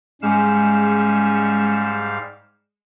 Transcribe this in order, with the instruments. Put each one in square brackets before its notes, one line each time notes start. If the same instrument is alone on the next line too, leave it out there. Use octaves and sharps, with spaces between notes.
[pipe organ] G#2 G3 F5 [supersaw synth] G#3 C#7 E7 [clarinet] C#4